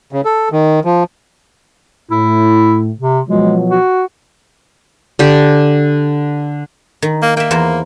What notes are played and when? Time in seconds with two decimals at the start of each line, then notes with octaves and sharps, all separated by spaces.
0.13 C#3
0.25 A4
0.52 D#3
0.85 F3
2.11 A2 E4
3.00 C3
3.29 B2 F3 F#3 G#3
3.70 F#4
5.19 D3 G4
7.02 D#3
7.22 A#3
7.37 A#3 E5 G5
7.51 E2 A#4 C5